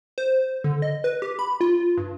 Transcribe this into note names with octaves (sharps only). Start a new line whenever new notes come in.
C5
D3
D#5
B4
G4
B5
F4
G2